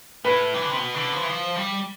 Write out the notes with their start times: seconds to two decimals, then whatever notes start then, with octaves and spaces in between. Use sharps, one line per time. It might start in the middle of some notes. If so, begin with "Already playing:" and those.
0.24 A2 B4
0.54 E3
0.62 D3
0.69 C3
0.77 B2
0.95 D3
1.12 F3
1.22 E3
1.29 F3
1.56 G3